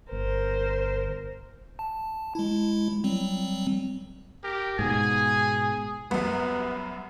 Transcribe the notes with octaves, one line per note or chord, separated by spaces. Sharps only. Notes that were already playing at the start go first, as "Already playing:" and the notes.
G1 A#4 C5
A5
G#3 E4
F#3 G3 C4
G4 A#4
G#2 B2 G#4 G#5
C2 F#2 B3